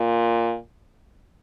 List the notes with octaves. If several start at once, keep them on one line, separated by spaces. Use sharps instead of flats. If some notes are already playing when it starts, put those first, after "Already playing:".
Already playing: A#2